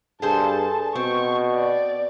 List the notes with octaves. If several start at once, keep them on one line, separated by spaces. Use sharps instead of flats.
G2 G#4 A4 C5 A5
B2 C4 C#6
D5